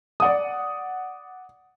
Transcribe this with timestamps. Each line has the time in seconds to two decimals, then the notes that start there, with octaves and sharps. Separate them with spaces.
0.20 D5 F#5 D#6